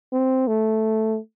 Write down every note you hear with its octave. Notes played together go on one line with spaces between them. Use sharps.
C4
A3